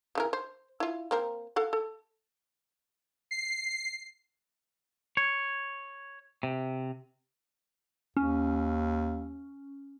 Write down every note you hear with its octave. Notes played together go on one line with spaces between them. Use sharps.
C#3 E3 A#4
C5
E4 F4
A#3 C4 A#4
A4 F5 F#5
A4
C7
C#5
C3
D#2 C#4